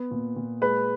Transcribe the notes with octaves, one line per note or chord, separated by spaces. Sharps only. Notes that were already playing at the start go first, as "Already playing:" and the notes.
Already playing: B3
A#2
A#2
G#3 B4